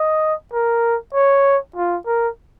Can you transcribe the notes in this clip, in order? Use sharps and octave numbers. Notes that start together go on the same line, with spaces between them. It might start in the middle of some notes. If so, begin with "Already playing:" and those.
Already playing: D#5
A#4
C#5
F4
A#4